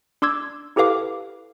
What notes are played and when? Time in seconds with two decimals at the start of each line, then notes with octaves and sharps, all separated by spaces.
0.22 D4 C6 D6 E6 G#6
0.76 E4 G4 A4 B4 F5 D6